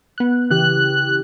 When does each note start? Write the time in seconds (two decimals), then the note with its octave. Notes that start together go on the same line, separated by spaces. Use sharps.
0.18 B3 F#6
0.50 C#3 E3 G4 F#6